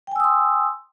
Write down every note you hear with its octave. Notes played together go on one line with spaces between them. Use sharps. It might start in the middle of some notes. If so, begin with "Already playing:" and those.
G5 G#5 C6 D#6 E6